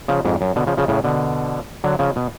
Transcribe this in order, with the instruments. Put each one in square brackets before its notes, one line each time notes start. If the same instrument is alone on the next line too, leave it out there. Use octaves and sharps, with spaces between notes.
[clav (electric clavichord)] C#3 F3
F2 G#2
F#2
B2 D3
C#3 F3
C#3 F3
A2 C#3
B2 D3
D3 F#3
C#3 F3
B2